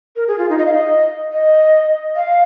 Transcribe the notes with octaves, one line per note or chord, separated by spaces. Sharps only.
A#4
G#4
F4
D#4
D#5
F5
D#5
D#5
F5